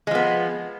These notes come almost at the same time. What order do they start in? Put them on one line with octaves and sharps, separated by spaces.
G#3 F3 B3